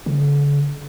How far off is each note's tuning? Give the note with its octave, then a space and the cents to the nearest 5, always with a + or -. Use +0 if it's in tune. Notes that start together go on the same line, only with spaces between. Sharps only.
D3 -45